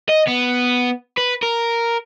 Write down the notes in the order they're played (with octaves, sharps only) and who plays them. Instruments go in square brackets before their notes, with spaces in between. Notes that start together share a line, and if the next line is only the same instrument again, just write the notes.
[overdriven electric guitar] D#5
B3
B4
A#4